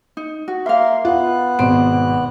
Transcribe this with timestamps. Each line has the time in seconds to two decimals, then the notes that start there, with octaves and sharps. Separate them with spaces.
0.17 D#4
0.48 F#4
0.66 A#3 A#4 E5 F5 C6
1.05 B3 F4 F#6
1.59 G#1 B2 C5 D7